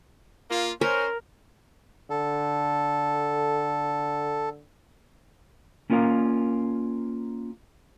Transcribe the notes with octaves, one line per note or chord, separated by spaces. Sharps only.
A#3 F4
C#4 A#4 C5
D3 A4
A#3 C#4 F4 A#4 D#5 F5